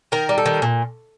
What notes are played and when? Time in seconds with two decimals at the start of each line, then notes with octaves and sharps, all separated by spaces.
0.12 D#3 A#4
0.29 G3
0.38 A4
0.46 D#3
0.62 A#2